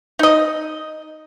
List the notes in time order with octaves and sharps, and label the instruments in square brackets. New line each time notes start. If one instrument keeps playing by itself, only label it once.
[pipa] D#4 D#5